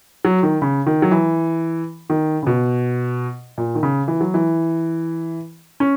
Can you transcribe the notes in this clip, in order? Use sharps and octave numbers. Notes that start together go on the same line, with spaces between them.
F#3
D#3
C#3
D#3
F#3
E3
D#3
C#3
B2
A#2
D#3
C#3
E3
F#3
E3
C#4